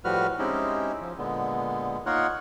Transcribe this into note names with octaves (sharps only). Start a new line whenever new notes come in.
A2 F3 G3 F#4 B4 F6
G#3 C4 C#4 D#4 E4 G4
F3
A#2 D3 G#3 B3
A#3 D#4 F4 A#4 C#5 F#5